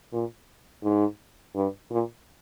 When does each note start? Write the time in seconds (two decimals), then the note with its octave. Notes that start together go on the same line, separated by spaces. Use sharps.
0.13 A#2
0.83 G#2
1.55 G2
1.91 A#2